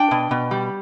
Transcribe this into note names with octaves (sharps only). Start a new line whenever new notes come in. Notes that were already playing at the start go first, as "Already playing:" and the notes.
Already playing: D4 G5
B2
B2
G3